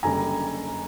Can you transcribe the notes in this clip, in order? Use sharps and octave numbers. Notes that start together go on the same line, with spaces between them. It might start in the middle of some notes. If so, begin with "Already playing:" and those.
F#1 F#2 D3 G3 G#5 A#5